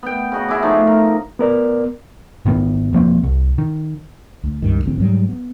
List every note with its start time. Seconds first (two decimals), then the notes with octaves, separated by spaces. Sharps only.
0.03 B3 G5
0.32 C#3 F#4 D#5
0.48 E4 G#4 D6
0.62 F3 A3 D#4 A5
0.87 A#4
1.39 B3 A#4 D5
2.45 G#1 D#3 B3
2.93 E1 F3 A#3 C4
3.23 C2
3.58 D#3
4.43 D2
4.62 C#2 G2 D#3
4.86 A1 D3 C4
5.00 G#2 F#3 G3
5.29 B3